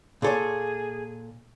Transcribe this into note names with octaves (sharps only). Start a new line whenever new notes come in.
A#2 G#4 A4 C#5